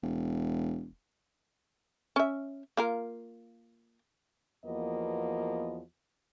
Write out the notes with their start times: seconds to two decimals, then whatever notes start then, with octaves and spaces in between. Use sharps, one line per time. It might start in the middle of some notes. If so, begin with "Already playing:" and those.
0.03 E1
2.16 C#4 E5
2.77 A#3 F4 A#4
4.65 E2 F3 A#3 B3 F#4 D#5